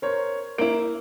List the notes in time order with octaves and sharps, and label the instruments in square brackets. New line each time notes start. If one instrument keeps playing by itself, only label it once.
[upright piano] A#4 C5 C#5
[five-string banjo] A#3 E4 [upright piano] D7